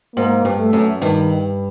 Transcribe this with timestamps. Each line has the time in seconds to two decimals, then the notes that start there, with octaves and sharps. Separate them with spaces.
0.16 G#2 A#3
0.45 G2
0.59 A3
0.73 F#2
1.02 G2 D#3